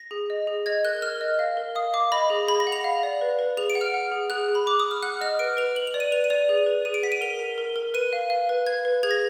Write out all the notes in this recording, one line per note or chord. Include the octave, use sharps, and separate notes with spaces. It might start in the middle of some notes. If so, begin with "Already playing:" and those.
Already playing: A#6
G#4
D#5
G#4
D#5 G#6
A#4 F#6
A#4 F6
D#5
F5
A#4
F5 D#6
F5 D6
D#5 B5
G#4
G#4 B5
A#6
F#5
F7
F5
D5
B4
B4
G#4 F7
D7
F#5
F6
F#5
G#4
G#4 F#6
G#4
B5
G#4 D6
G#4 D#6
F6
F#5 F#6
D#5 F6
B4 D7
B4 F7
B4 F#7
F7
D5
D#7
B4 F7
D#7
D5 F7
G#4
B4
G#4 D#7
D7
F#5 B6
D#7
A#4 F7
A#4
A#4
A#4
B4 D#7
F5
F5
B4
B4 G#6
B4
G#4 G#6
A#6